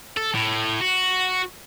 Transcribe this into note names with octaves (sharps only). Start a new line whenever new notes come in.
A4
A2
F#4